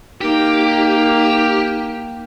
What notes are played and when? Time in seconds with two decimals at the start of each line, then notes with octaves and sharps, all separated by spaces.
0.21 A#3 D#4 G4 G5